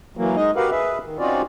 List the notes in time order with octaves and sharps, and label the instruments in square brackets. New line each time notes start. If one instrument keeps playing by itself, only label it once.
[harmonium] E3 F#3 A#3
G#3 D#4 D#5
F#4 G4 A#4 B4 F5 F#5
G#4 B4 E5
D#3
C4 C#4 D#4 F4 F#4 D5